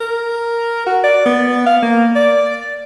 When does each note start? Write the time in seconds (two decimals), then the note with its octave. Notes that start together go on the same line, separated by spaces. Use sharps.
0.01 A#4
0.86 F#4
1.04 D5
1.26 B3
1.66 F5
1.82 A#3
2.15 D5